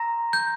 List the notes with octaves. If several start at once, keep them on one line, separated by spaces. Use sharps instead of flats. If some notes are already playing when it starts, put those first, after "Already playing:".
Already playing: A#5 C6 E6 A#6
G6